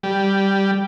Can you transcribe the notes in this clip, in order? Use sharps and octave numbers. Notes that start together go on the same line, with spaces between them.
G3